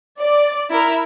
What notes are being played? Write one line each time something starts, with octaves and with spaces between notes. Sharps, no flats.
D5
E4 A#4